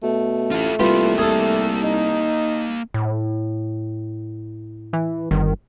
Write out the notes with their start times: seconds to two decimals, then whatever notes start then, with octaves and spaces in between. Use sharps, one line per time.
0.03 B2 A3
0.51 A1 F4 A4
0.79 C2 A#3 F4 G4 B4
1.18 C2 G#4 A4
1.83 D#4
2.94 A2
4.93 E3
5.31 G1 D#3